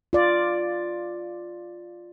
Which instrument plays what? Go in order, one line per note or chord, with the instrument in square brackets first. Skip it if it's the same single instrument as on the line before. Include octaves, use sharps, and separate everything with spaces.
[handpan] F4 D5